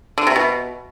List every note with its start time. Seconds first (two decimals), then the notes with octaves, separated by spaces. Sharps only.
0.18 D3
0.27 C3
0.36 B2